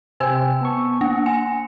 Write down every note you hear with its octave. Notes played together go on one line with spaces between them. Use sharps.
C3 C5 G5 G#5 E6
B3 A5 C#6
A#3 F#5 A#6
G#5 C#7